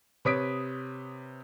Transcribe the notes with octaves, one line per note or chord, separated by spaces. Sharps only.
C3 B4 C#5 D#6 B6 D7